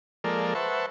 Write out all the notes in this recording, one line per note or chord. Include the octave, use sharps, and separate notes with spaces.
F3 G#3 A#3 A4 A#4 D5
B4 C5 E5 F#5 A5 C#6